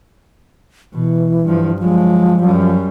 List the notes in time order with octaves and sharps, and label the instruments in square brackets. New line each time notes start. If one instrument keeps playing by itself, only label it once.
[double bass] B2 [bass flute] E3
[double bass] G2 F3
[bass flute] F3 [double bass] F#3 G#3
[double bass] F#2 G3